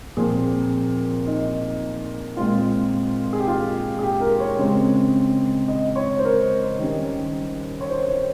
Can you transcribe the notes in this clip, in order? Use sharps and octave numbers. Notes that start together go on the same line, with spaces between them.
A#2 F3 C4 G#4
D#4
A#2 G#3 C4 F4
G#4
G4
F4
G#4
G4
A#4
C#5
C#3 G#3 C4
D#5
C#5
C5
A#4
D#3 G3 C#4
C#5
C5
C#5